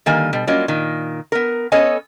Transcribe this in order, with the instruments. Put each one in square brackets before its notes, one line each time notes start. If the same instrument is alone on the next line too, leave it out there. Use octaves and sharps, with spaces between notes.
[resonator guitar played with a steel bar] D3 D#3 G3 A#3 G#5
B2 G3
F#3 G3 A#3 C#4 F4 D#5
A#2 D#3
B3 A#4
B3 C#4 A4 C#5 D#5 G#5